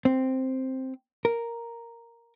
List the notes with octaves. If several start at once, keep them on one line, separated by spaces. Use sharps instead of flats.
C4
A#4